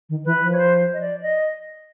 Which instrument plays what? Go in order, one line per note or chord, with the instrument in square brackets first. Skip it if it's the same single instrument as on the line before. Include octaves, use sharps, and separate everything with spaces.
[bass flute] D#3
[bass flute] E3 [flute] B4
[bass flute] F3
[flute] C#5
C5
D#5
D5
D#5